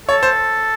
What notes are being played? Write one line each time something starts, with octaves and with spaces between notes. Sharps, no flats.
A4 C#5
C5